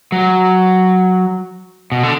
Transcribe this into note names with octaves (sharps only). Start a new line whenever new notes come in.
F#3
B2
D3